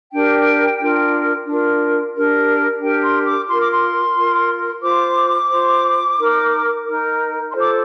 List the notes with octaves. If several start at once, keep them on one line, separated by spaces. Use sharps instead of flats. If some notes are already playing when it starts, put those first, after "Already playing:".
D4 G4 A#4 G5
D4 F4 A#4
D4 F4 A#4
D4 G4 A#4
D4 G4 A#4 G5
C6
D6
F4 A#4 C6
D6
C6
F4 A#4
F4 C5 D6
F4 C5
D#4 A#4
D#4 A#4
F4 A4 C5 C6
D6